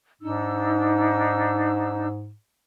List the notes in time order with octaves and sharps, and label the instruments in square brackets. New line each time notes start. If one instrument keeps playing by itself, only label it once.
[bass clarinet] G#2 [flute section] D4 D#4 E6